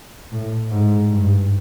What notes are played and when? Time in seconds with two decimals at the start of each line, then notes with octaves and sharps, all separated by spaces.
0.31 A2
0.71 G#2
1.12 G2